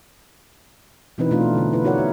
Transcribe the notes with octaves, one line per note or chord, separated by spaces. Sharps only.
B2 E3 C4 D#4 E4 B4
B2 A3 C4 D4 F4
D3 A3
E4 B4
D#4 F#4 A#4 C#5 D5 F#5
B2 E5